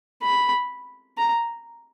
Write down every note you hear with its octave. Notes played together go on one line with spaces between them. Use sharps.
B5
A#5